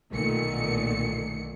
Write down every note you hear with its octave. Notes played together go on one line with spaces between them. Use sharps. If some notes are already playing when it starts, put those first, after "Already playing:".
B1 A#2 D3 D#3 A3 C#7